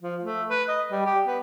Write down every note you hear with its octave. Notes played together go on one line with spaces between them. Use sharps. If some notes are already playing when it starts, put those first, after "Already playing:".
F3
A3
B4
D#5
G3
G4
B3